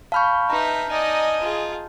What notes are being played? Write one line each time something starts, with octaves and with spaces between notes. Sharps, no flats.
F5 A5 B5 C#6 F6 G6
D#4 B4 E5 A#5
D#4 D5 D#5 G#5
F4 G#4